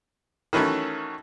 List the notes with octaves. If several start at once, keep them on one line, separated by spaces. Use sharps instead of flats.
D#3 E3 F#3 A3 C#4